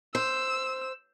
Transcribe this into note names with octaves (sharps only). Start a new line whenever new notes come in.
C5 E6